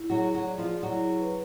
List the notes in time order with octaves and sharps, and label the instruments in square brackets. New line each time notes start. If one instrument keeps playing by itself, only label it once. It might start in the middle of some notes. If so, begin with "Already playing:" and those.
Already playing: [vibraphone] E4
[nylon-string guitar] F#3 F#4 [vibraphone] G#4
[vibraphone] G#4
[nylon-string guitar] F#3 F#4
[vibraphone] D5
[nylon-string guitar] F3 F4
[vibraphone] G#4
[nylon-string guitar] F#3 F#4 [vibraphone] E4
[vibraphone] G#4
B4